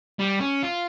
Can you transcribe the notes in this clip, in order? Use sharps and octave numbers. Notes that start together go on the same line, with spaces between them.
G3
C#4
F4